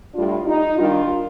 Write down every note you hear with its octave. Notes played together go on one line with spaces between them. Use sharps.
A2 G3 D4 F4
D#4
D#3 G3 D4 F4